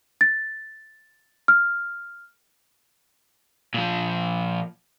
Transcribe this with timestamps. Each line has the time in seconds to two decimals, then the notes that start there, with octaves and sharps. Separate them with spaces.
0.21 A6
1.48 F6
3.74 A#2 F3